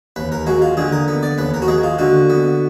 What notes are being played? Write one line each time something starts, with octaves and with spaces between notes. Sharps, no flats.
D#2 B4
A#4
G#3 F#4
F4
D3 G#4
A#4
B3
D5
D#2 B4
A#4
F#4
G#3 G#4
F4
D3 F#4
B3